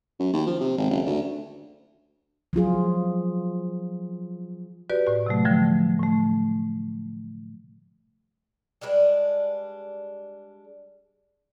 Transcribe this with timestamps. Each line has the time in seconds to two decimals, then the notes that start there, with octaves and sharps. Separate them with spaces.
0.19 F#2
0.33 D#2
0.47 F3
0.60 C3
0.78 G#1
0.90 F#1
1.06 D2
2.53 F3 F#3 F4 G#4
4.90 F#4 G4 B4 D5
5.07 A2 F#4
5.26 C3 F#3 A3
5.45 D3 F3 G3 A3
5.99 A2 A3
8.81 G3 G#3 D4 B4